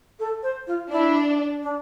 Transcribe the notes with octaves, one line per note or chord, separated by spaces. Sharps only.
A4
C5
F4
D4 E4
D4